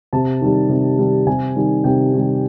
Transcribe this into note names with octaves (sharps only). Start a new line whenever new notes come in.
C3 A5
D#3 G3
C3
D#3 G3
C3 G#5
D#3 G3
C3 G5
D#3 G3